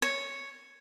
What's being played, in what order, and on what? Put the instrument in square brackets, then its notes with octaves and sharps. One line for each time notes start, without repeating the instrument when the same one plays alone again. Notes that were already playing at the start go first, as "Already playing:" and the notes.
[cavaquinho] C#5